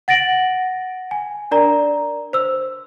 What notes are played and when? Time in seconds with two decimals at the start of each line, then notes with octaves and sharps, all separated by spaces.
0.08 F#5 A6 A#6 D7 F#7
1.11 G#5
1.51 D4 A#4 D5 A#5
2.33 C5 E6